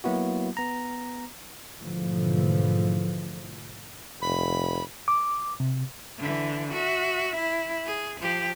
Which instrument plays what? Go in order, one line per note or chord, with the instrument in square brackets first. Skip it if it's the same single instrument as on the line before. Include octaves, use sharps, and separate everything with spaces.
[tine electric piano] F#3 A#3 B3 E4 F#4
B3 A#5
[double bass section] G#2 B2 D3 E3 F3 A3
[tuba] F1 [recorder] B5
[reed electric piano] D6
C3
[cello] D3 E3
F#4 E5
E4
G#4
F3 G4